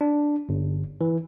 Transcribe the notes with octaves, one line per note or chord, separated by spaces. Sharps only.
D4
G1
E3